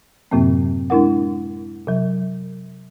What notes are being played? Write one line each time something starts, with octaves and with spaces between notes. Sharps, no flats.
F#2 A2 C3 F#3 A#3 C4
G#3 D4 E4 A#4 F#5
C3 F#3